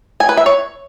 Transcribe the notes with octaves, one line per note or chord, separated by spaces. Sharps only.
G#5
B4
E5
C#5